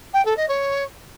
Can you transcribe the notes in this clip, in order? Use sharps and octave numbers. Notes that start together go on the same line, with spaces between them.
G5
A4
D#5
C#5